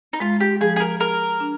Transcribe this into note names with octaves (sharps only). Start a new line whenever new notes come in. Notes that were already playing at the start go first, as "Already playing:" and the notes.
D#4
G#3 F4
G4
F3 G#4
G#4
A#4
G#4 A#4
D4